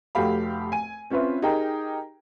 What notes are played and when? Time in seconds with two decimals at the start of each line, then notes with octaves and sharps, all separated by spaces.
0.15 F1 A3 F#4 G4 F5 B5
0.72 G#5 D#7
1.10 C4 C#4 F4 B4 E5
1.42 D#4 G4 G#4 A#4 G5 A#5